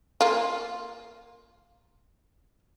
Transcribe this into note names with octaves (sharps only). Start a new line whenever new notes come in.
A#3 F4